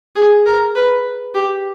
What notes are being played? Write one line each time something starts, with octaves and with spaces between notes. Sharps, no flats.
G#4
A#4
B4
G4